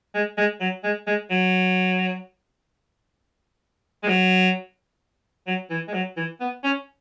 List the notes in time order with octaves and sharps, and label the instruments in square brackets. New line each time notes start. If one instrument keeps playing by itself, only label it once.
[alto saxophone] G#3
G#3
F#3
G#3
G#3
F#3
G#3
F#3
F#3
E3
G#3
F#3
E3
B3
C#4